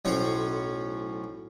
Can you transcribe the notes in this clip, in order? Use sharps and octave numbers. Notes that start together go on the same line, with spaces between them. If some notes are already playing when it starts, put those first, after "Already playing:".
B1 A2 C#4 C5 C#5 C#6